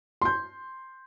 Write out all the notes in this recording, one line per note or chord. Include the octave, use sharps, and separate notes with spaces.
C6 G6